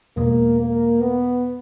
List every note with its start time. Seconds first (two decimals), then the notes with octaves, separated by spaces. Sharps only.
0.17 E2 B2 G#3 A#3
0.60 A#3
1.01 B3